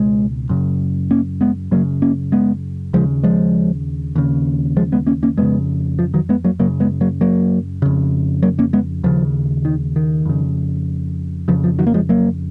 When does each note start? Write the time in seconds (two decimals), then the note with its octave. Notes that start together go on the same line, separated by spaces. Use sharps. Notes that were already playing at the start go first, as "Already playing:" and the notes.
Already playing: C#2 B2 G#3
0.49 F#2 C#3
1.11 A#3 C#4
1.41 G#3 B3
1.71 F#2 C#3 F#3 A#3
2.02 A#3 C#4
2.32 G#3 B3
2.93 D#2 C#3 F3 G#3
3.24 F3 G#3
4.16 D#2 C#3
4.77 F3 G#3
4.92 G#3 B3
5.07 A#3 C#4
5.23 A#3 C#4
5.38 F2 C#3 G#3 B3
5.99 F3
6.14 D#3 F#3
6.29 G#3 B3
6.44 F#3 A#3
6.60 F#2 C#3 F#3 A#3
6.80 G#3 B3
7.01 F#3 A#3
7.21 F#3 A#3
7.82 F2 C#3
8.43 F#3 A#3
8.59 A#3 C#4
8.73 G#3 B3
9.04 D#2 C#3 F3
9.65 D#3
9.96 D#3
10.26 F2 C#3
11.48 F2 C#3 F3
11.64 F3
11.79 D#3 F#3
11.87 A#3
11.94 F3 G#3
12.09 F#3 A#3